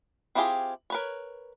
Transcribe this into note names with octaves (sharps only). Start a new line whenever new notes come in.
C4 E4 F4 G4 G#4
A#4 B4 C#5